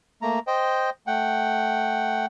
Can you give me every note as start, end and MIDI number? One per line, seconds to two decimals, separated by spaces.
0.22 0.39 57
0.22 0.39 58
0.22 0.39 82
0.47 0.90 72
0.47 0.90 75
0.47 0.90 79
1.07 2.26 57
1.07 2.26 78
1.07 2.26 79